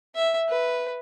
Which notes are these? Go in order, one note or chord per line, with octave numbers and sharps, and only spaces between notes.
E5
B4